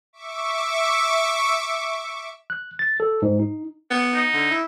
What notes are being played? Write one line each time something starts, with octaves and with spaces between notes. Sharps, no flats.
E5 C#6 D6
F#6
A6
A4
G#2
D#4
B3
D#4
D3
E4